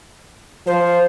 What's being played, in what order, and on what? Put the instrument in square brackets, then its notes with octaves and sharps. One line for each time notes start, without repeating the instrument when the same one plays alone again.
[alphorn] F3 [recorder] C5